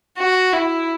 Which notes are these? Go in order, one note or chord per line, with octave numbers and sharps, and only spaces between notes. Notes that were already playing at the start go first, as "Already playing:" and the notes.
F#4
E4